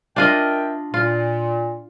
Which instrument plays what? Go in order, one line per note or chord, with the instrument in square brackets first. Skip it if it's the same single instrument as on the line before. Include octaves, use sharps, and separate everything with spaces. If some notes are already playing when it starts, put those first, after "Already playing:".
[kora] D4 F4 D#5 [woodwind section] A#4 E5 G5
[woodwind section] A#2 [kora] F4